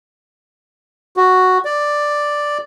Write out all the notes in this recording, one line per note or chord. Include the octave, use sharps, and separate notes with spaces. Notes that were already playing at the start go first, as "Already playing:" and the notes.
F#4
D5